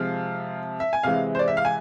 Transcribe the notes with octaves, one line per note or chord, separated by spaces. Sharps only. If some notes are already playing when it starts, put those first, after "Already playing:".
Already playing: C3 F3 G#3 F5
E5
G#5
C3 E3 G#3 F5
C5
D5
E5
F5
G#5